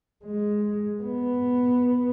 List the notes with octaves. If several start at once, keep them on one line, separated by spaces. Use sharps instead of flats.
G#3
B3